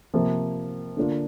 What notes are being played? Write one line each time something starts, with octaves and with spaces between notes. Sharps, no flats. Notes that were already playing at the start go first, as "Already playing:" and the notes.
C3 F3 A#3
D3 A#3 D4 F4